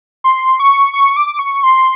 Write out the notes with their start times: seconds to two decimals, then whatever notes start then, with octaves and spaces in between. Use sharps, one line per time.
0.24 C6
0.59 C#6
0.94 C#6
1.16 D6
1.39 C#6
1.63 C6